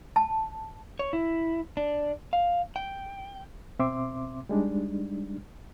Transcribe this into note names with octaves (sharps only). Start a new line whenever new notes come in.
A5
C#5
E4
D4
F5
G5
B2 C4 E5 C6 D6
G3 G#3 D4 D#4